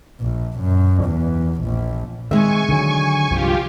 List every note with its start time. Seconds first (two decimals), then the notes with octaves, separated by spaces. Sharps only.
0.20 A#1
0.60 F#2
1.04 E2
1.63 A#1
2.31 D#3 G#3 C4 E5 G#5 C#6
2.69 D3 D#3 F#3
3.31 C2 G2 F3 F4 G4